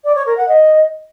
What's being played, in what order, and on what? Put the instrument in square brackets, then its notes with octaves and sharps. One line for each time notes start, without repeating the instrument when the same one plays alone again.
[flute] D5
C#5
A#4
F#5
D#5